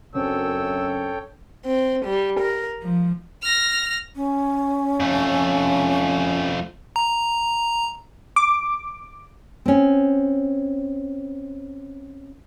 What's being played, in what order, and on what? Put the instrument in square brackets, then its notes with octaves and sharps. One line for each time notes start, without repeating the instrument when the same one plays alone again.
[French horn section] F#2 [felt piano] C#3 C4 D4 [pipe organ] A4 C#5 G5 [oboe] E6
[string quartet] C4
G3
A#4
F3
[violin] F6 A#6
[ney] C#4
[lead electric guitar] F2 A3
[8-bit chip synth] A#5
[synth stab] D6
[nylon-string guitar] C4 C#4